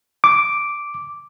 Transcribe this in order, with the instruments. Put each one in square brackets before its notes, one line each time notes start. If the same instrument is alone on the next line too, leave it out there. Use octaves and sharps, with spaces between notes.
[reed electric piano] D6